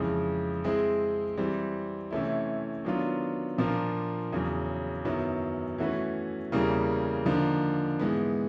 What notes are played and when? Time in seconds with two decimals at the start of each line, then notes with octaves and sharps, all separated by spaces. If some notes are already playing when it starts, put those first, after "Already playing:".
Already playing: F2 C#3 E3 G#3
0.64 G#3 C4 E4 G#4
1.37 E3 G3 C4
2.11 C3 E3 A3 C#4 E4
2.85 D#3 F#3 B3 D4 F4
3.58 A#2 F3 A#3 D4 F4
4.32 E2 C#3 F#3
5.05 F#2 D#3 F#3 B3 E4
5.78 E3 A3 C#4 F#4 B4
6.52 E2 C#3 E3 G3 A#3
7.26 D3 F3 A#3 D#4
7.99 G#2 E3 G#3 B3